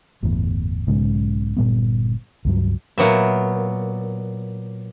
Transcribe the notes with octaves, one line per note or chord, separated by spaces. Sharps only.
G1 E2 A2
B1 G#2 C#3 G#3
G1 A#2 G3 B3
C#2 G2 F#3
A#2 F#3 B3 E5